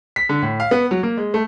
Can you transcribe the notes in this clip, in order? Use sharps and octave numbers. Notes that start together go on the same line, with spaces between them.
B6
D3
A2
F5
B3
F#3
A#3
G#3
A3